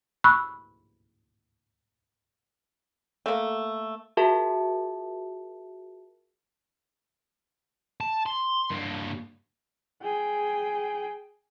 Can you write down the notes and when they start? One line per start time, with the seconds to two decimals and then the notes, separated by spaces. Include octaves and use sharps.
0.24 B5 C#6 E6 F#6
3.26 A3 A#3
4.17 F4 F#4 G#4 A#4 E5 A5
8.00 A5
8.26 C6
8.71 G2 A#3
10.02 G#4 G5